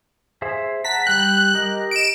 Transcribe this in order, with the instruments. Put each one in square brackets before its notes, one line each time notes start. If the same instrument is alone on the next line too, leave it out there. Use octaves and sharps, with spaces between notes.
[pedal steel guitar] G#4 C5 E5
[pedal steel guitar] F#5 A5 A#5 [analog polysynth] B6
[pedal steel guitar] G3 G5 [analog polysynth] F#6
[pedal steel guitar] G4 A#4 D#5
[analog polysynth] D7 E7